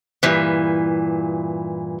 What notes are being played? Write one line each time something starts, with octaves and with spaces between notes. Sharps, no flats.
G2 A#2 E3